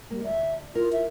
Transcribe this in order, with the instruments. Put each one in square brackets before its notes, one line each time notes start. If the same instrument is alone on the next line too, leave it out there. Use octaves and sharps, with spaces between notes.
[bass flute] G3 [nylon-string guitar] A#3
[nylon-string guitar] D2 [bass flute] E5
[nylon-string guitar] E4 A#4 [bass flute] F4
[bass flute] E5